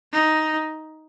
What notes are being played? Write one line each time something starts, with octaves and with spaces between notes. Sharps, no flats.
D#4